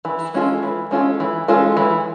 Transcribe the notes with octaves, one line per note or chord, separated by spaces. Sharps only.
E3
G#3 C#4 F4 A4
E3
G#3 C#4 F4 A4
E3
G#3 C#4 F4 A4
E3